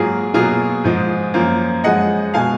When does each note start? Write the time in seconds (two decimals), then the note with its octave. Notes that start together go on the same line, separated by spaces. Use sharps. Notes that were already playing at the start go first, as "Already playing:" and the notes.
Already playing: G#2 F#3 A#3 F4 G#4
0.34 B2 F#3 A#3 F4 G#4
0.84 G#2 F3 G#3
1.34 F#2 F3 A#3
1.84 F#2 F3 G#3 D#5 F#5
2.34 B2 G#3 F5 G#5